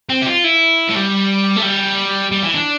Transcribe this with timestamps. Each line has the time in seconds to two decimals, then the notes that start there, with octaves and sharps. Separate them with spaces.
0.09 C4
0.22 G4
0.26 F4
0.44 E4
0.89 A3
0.95 G3
1.57 A3
1.63 G3
2.31 G3
2.43 E3
2.54 D4